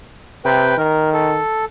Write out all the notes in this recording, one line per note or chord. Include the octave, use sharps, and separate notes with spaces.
C3 B4 G5
D#3 A#4
A4